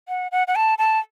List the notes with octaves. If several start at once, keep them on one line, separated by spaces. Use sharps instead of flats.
F#5
F#5
F#5
A5
A5